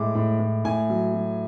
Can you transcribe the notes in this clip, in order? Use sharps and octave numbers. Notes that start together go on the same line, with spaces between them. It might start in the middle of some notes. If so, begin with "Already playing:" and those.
Already playing: A2 G#3 D6
A2
A2
A2 G#5
F#3
F#3